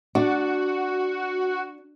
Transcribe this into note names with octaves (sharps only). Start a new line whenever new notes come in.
D4 F#4